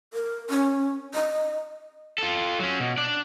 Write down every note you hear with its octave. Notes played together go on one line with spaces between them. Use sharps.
A#4
C#4
D#5
F4 A4
F#3 C#4
B2
D4 D5